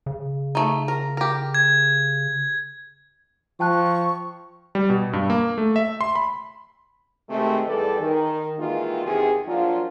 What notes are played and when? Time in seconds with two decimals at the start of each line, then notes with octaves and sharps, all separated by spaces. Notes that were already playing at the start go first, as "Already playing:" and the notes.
0.06 C#3
0.55 A3 D#4
0.88 A#4
1.17 G4 A#4
1.55 G#6
3.60 F3 G5 A5 C#6 F#6
4.75 G3
4.90 B2
5.13 G2
5.30 A#3
5.58 A3
5.76 E5
6.01 C6
6.16 B5
7.29 C3 D#3 G#3 A3
7.68 E2 G3 G#4 A4 B4 D5
8.00 D#3
8.59 D#3 E3 G#3 A#3 F4 F#4
9.06 E2 C3 D#3 G4 G#4
9.47 F3 F#3 A#3 D4 F4